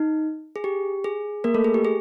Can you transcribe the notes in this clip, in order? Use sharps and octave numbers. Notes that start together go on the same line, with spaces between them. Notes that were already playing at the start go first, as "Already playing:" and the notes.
Already playing: D#4
G#4
G4
G#4
A#3 A#4
A3 A4
G#4
G4
G#4